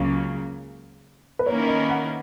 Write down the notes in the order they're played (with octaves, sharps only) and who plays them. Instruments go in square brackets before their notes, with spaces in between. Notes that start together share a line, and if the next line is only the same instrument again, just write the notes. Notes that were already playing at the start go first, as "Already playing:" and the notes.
Already playing: [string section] C#2 C#3 F#3 A#3
[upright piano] B4
[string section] D#3 A#3 C#4 E4 A#4 [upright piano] C#5
[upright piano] D#5
F#5